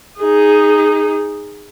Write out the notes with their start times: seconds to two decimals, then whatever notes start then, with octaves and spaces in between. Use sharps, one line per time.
0.20 D#4 G#4